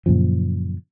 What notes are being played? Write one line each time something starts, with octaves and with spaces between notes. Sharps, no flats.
F#2 A#2 C#3 F3